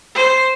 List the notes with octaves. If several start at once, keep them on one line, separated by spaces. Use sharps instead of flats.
C5